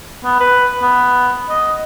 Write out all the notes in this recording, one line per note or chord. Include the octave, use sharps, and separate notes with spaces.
B3
B4
B3
D#5